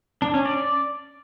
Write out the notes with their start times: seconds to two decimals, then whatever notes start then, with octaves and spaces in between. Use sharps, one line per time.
0.22 D4
0.34 C#4
0.46 D5